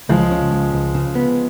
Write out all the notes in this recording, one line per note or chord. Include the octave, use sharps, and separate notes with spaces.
C#2 F3 G#3
C#3
C#2
C#2
C#3
B3